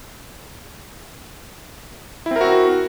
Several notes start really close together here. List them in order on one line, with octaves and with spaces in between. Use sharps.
E4 C4 A#4 F#4